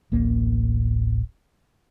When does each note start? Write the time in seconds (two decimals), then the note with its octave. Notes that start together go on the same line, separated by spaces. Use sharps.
0.12 D1 A1 A#3